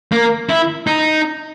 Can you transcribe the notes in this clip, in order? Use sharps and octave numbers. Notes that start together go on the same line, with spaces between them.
A#3
E4
D#4